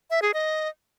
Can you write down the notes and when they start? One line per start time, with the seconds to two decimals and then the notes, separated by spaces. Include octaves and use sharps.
0.10 E5
0.22 G#4
0.34 D#5